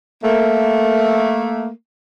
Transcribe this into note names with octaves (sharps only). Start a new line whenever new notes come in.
A3 A#3